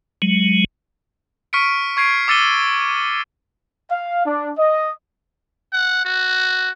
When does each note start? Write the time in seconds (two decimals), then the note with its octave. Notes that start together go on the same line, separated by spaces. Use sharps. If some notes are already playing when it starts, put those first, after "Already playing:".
0.22 F#3 G#3
1.53 C#6 F6 B6 C#7 D7
1.97 C#6 G#6 C7 D7
2.28 D6 E6 A6 C#7 D#7 G7
3.91 F5
4.26 D4
4.58 D#5
5.73 F#5
6.05 F#4